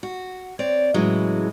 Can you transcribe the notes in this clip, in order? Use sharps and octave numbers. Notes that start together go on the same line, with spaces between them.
F#4
C4 C#5 D5
A2 C#3 E3 F#3 G#3